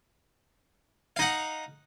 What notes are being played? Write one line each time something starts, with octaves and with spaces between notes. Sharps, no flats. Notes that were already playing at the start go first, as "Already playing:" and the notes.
D#4 F5 F#5